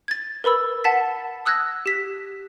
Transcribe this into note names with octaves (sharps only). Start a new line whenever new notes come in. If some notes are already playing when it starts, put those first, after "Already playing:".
G#6 A6
A#4 B4 B5 E6
F#5 A5 A6 B6
D#6 E6 F#6 G#6 A#6
G4 B6